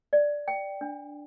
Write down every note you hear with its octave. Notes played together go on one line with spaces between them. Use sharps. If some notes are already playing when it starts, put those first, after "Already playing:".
D5
G5
D4